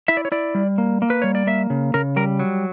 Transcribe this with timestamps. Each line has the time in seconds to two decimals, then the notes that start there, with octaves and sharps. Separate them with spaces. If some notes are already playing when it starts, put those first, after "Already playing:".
0.08 E4 E5
0.17 D5
0.25 C#5
0.32 E4 D5
0.55 G3
0.78 A#3
1.02 A#3
1.10 B4
1.22 G3 C#5
1.35 D5
1.47 A#3 E5
1.70 C#3
1.94 C#3 A#4
2.16 G3 A#4
2.39 F#3